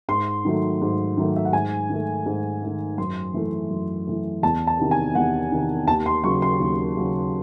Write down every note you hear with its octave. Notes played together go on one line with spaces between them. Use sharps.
G#2 C6
D#3 F#3 A3
G#2
D#3 F#3 A3
E5
F#5
G#2 G#5
D#3 A3
G#2
D#3 A3
F#2 C6
E3 A3
F#2
E3 A3
E2 A5
A5
C3 D#3
G#5
E2 F#5
C3 D#3
D#2 A5
C6
C#3 F#3 C#6
C6
D#2
C#3 F#3